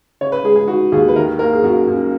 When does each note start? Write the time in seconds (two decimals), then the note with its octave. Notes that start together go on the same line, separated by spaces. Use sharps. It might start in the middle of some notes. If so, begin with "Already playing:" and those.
0.21 C#3 C#5
0.32 B4
0.44 G#3 G#4
0.56 G#4
0.68 D#4 F#4
0.92 D#2 G#4
1.08 B4
1.16 D#3 A#4
1.39 A#3 A#4
1.52 G#4
1.63 F#2 F#4
1.87 F#2